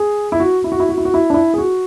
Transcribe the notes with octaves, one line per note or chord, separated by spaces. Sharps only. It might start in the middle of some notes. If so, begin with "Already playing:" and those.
Already playing: G#4
E4
F#4
E4
F#4
E4
F#4
E4
F#4
E4
D4
E4
G#4
F#4